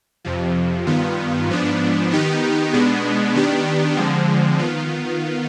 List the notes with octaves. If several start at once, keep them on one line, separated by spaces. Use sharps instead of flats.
F2 C3 F3
G2 D#3 B3 F4
G#2 F3 B3 D4
D#3 B3 D#4 G4
B2 G#3 B3 D4
D#3 B3 D4 G4
D3 F3 G#3 C4
D#3 B3 F4